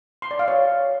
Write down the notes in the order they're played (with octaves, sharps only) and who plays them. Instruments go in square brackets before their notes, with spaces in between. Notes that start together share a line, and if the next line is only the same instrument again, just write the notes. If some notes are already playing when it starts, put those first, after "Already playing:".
[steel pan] C6
D5
F5
C#5